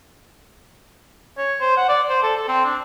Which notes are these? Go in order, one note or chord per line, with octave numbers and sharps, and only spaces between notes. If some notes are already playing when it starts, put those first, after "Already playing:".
C#5
C5
F#5
D5
C5
A4
A4
C4
D4